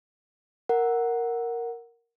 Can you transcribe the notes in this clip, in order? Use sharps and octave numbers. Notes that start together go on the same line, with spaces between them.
A#4 F#5